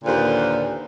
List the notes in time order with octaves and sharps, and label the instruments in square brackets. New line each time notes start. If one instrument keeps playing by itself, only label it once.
[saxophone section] D#2 A#2 D3 F4 B4 C5